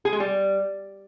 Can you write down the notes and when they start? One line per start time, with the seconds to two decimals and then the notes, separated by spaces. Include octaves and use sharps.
0.05 G#4
0.13 G#3
0.20 G3